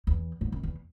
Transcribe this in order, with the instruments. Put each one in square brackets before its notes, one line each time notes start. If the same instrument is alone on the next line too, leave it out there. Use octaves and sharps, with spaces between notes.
[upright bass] E2
G#2
F#2
E2